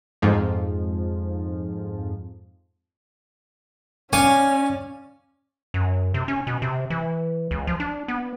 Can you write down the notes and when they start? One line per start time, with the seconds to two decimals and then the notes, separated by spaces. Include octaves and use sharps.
0.22 F2 G#2 F3
4.13 C#4 C#5 D5 F5 G#5
5.74 F#2
6.14 C3
6.28 C#4
6.47 B2
6.62 C3
6.90 E3
7.51 C#2
7.67 F3
7.80 D4
8.08 B3